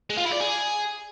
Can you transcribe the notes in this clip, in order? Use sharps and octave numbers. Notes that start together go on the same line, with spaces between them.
G#3
F4
E4
D5
G#4